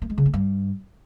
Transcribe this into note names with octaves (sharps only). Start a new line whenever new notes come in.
A#3
G#3
C#3
A#3
G2